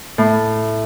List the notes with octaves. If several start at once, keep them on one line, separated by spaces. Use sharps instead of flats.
A2